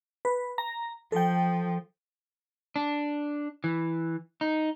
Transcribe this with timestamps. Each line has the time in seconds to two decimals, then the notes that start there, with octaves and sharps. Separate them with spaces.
0.25 B4
0.58 A#5
1.12 F3 A4 G5
2.76 D4
3.64 E3
4.41 D#4